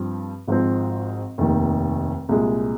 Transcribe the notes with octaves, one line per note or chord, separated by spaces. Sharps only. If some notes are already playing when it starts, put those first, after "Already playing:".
Already playing: G2 F3 C4
G#1 G#2 F3 C4
F1 D#2 D#3
C2 A#2 G#3